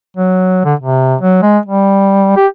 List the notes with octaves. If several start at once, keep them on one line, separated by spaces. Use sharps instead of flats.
F#3
D3
C3
F#3
G#3
G3
G4